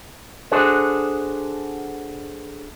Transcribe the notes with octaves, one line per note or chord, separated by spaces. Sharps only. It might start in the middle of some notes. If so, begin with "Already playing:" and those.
D4 F#4 G#4 A4 C5